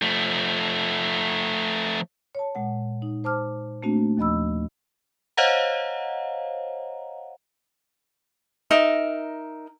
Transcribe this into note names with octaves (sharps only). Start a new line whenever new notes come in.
F3 A3
C#5 A5
A#2 G#3 F#5
D#4
C5 A5 D6 F6
A3 A#3 C4 D4 F#4
D#2 F3 D#5 B5 E6
C5 C#5 D#5 F5 F#5 A#5
D#4 A#4 E5